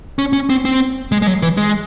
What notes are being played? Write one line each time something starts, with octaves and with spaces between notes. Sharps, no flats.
C#4
C#4
C4
C4
G#3
G#3
F#3
E3
G#3